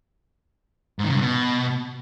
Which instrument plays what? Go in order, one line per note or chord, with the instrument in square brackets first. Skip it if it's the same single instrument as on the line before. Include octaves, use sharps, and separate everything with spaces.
[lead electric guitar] G#2
D#3
C#3
G2
B2